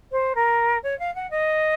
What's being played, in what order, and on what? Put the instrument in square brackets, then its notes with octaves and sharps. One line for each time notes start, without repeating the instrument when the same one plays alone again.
[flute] C5
A#4
C#5
F5
F#5
D#5